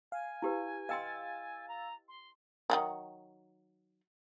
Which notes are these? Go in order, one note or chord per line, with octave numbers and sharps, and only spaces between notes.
F5 G#5
E4 G4 B4
D#5 F5 G5 C6 E6 A6
A#5
C6
D#3 E3 F#3